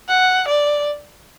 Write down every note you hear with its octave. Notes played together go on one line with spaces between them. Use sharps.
F#5
D5